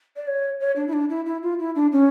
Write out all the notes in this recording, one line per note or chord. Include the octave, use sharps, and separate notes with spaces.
D5
C#5
C#5
D4
E4
D4
E4
E4
F4
E4
D4
C#4